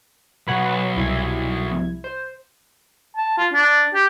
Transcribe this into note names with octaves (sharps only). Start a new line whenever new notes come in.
B1 B4 C#5 F#5
C2 E4 G#6
C5
A5
F4
D4
G4